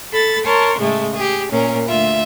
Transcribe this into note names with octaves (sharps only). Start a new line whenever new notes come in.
A4 B5 A6
A#4 C#5 A5 C6
A2 C#3 G#3 A3
G4 G#4
A#2 C#4 A#4
D2 F4 E5